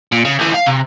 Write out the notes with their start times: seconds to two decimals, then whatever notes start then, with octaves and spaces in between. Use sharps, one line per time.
0.12 A#2
0.25 C#3
0.39 D2 E3
0.54 F5
0.66 C3